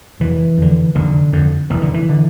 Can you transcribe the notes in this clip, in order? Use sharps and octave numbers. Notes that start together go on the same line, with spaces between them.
F1 E3
F2 D3
F1 D3
F2 D3
F1 E3
D3
E3
D3